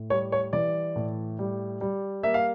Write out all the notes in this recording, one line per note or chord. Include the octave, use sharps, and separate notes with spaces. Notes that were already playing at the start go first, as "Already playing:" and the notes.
Already playing: A2
G3 C#5
C#5
E3 D5
A2
G3
G3
A#3 E5
F5